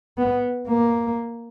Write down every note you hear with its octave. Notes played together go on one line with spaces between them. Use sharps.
B3
A#3